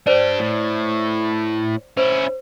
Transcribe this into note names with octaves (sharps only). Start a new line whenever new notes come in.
D4 G4 C5 D5
A2
C#4 E4 C5